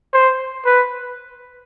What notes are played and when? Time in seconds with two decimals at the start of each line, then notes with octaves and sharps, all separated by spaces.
0.13 C5
0.65 B4